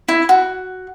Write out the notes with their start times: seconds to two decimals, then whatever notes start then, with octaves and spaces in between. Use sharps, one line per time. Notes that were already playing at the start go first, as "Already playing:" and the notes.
0.08 E4
0.29 F#4